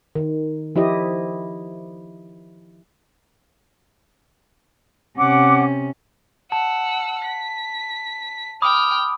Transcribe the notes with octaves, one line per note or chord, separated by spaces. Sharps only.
D#3
F3 E4 G4 D#5
C3 C#4 F#5 D6
F#5 A5 E6
B6
G5 B5 D6 D#6 F6